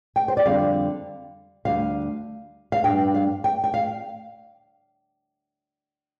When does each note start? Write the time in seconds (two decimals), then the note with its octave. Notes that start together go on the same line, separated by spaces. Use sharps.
0.16 G5
0.28 C5
0.37 D5
0.46 F2 D3 G3 C4 F5
1.65 D2 D3 G3 F5
2.72 F5
2.84 G2 G3 D4 G5
3.14 F5
3.44 G5
3.64 G5
3.74 F5